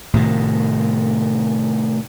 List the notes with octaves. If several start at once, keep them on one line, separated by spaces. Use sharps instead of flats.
A2 C3 D#3